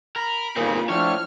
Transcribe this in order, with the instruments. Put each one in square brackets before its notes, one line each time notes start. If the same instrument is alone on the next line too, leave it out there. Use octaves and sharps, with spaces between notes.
[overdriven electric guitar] A#4 [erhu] B5
[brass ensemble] G1 D#2 A#3 [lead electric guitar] A#2 [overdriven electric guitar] C4 G#4
[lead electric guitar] A2 [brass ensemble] F3 D4 [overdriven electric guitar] C#5 [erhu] F6